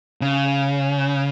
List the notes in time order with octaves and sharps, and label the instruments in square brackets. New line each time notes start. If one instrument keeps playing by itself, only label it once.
[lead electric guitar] C#3